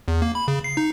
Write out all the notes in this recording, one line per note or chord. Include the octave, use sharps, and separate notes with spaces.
E2
A#3
B5
C#3
C7
D#4